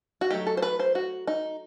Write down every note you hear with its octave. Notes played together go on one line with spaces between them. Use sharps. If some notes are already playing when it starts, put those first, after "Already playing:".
F#4
F#3 A3 D#4 G4
A4
C5
B4
C5
F#4
D#4